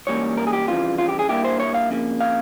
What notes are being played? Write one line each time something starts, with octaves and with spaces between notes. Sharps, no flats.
G#2 E3 G3 A#3 C#4 C#5
A#4
G#4
G4
F2 C#3 E3 G3 F4
F4
G4
G#4
G2 G3 A#3 E4 G4
C5
C#5
F5
F2 C#3 A#3
F5